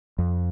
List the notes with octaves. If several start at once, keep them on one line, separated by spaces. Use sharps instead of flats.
F2